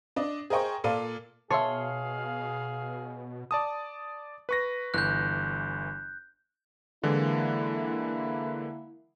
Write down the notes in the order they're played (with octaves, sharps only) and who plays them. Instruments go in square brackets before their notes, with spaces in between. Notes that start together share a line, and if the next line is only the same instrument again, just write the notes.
[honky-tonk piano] D4 D5 D#5
G#4 A#4 C5 D#5 G5 C#6
A#2 A4 D5 F5 D#7
[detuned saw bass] B2 [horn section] G#4 F5 [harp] C#5 C6 [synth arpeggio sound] E5 A5
[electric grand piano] D5 A5 D#6
B4 C#6 A#6
[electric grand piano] G1 E3 [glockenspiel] F#6 G6
[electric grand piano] D3 E3 G#3 [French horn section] A#3 E4